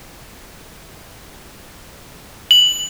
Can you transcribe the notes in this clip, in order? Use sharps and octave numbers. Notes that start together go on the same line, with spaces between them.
F#7